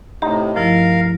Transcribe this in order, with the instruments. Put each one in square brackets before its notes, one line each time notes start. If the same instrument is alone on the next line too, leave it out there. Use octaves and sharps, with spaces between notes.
[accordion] A2 C3 [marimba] A3 G4 [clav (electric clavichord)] D#4 A#5
[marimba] G2 F3 E4 [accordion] A#4 F5